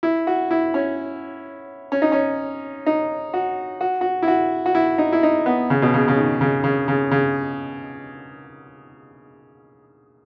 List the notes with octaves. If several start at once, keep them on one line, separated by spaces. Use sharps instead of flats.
E4
F#4
E4
C#4
C#4
D#4
C#4
D#4
F#4
F#4
F#4
E4
F#4
F#4
E4
D#4
E4
D#4
B3
C#3
B2
C#3
C#3
D#3
C#3
C#3
C#3
C#3